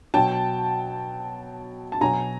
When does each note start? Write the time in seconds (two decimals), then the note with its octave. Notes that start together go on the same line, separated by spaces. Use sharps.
0.14 B2 F#3 G5 A5
1.92 A5
2.01 B2 F#3 G#5 A#5